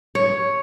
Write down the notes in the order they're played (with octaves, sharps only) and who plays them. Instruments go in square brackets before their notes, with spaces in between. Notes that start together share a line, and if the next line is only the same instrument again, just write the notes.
[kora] C#5